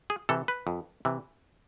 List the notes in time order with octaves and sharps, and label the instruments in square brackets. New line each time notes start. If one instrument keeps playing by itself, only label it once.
[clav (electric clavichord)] G#4
C3 E3 A4
B4
F2
C3 E3